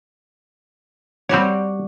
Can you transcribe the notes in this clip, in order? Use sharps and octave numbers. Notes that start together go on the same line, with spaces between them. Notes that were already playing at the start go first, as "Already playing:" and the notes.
G3 C4 F#4 G4 C#5